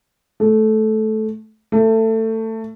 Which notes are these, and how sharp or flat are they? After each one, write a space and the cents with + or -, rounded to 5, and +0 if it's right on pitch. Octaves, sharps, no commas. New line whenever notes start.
A3 -15
A3 +20